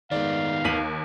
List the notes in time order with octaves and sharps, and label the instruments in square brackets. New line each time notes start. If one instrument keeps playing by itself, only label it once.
[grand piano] G#2 D5 [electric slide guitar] D#3 B3 [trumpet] F5
[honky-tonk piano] D#2 [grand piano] B6 D#7 F#7